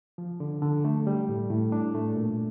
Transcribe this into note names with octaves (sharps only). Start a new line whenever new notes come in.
F3
D3
D3
A3
G3
A2
A2
D4
A3
A#2